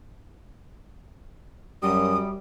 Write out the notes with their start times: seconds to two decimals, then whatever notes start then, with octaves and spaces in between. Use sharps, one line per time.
1.83 F#2 G3 D#6